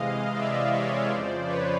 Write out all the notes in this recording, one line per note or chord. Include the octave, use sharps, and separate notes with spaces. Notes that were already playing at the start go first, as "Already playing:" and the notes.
Already playing: C3 E3 G#3 D#5 F5
D5 E5
C#5 D#5
F2 C#3 F3 C5 D5
B4 C#5